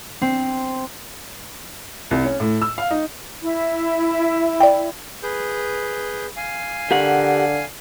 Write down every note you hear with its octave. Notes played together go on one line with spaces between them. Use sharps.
C4
C2
C#4
A2
E6
F5
D#4
E4
D5 G5
G#4 B4 G6
F5 G#5
D3 G4 A#4 F#5